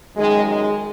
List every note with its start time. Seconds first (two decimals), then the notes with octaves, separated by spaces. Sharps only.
0.16 F#2 D#3 G#3
0.45 G#3